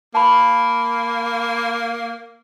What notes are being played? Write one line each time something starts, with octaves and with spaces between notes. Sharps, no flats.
A#3 A5 B5